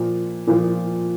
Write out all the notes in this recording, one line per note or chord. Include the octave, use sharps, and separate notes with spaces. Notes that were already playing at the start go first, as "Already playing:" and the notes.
Already playing: A#2 F3
A#2 F3